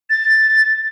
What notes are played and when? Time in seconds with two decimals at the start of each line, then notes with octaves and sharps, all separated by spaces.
0.10 A6